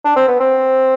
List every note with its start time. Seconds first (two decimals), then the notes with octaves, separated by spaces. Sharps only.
0.05 D4
0.16 C4
0.28 B3
0.40 C4